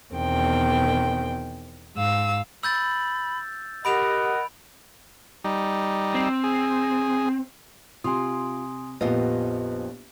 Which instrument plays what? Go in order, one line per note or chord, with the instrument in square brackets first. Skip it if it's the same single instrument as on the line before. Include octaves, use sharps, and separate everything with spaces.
[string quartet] E2 B2 D#3 C4 G5
G#2 F5 E6
[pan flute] B5 [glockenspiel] E6 G6 A6
[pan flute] G4 [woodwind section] A#4 D#5 F#5 [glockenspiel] B5 D7 F7
[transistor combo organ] G3 D#4
[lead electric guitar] C4
[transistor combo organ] G#4
[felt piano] C3 [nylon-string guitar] F4 [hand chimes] G#5 C6 D#6
[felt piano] A#1 B3 G4 [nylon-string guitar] F2 F4 D#5 [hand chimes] B4